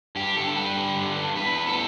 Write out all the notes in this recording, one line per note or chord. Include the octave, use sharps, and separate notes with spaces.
G2 G4
G2 A4
G3 B4
D3
G2
G2
E2 B4
E2
A4